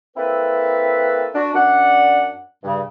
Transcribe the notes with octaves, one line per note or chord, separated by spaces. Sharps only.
A#3 C4 E4 A4 B4
D4 F#4
F#2 D4 D5 F#5
G2 C#3